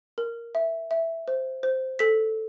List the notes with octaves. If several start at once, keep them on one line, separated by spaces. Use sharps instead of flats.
A#4
E5
E5
C5
C5
A4 B6